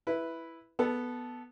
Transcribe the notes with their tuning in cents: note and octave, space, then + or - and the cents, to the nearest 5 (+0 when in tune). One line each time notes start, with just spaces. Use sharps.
E4 +0 B4 +0
B3 -5 A4 -10